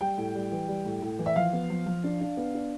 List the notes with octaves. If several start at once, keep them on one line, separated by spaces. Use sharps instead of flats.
G3 G5
A2
G3
E3
G3
A2
A2
E3
E5
F3 F5
B3
F3
F3
D4
D4
B3
D4